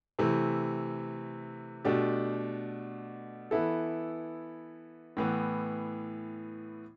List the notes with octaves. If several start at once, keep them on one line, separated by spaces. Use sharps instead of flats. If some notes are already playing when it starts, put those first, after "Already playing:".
C3 E3 A3
B2 A3 D4 G4
E3 B3 E4 A4
A2 E3 B3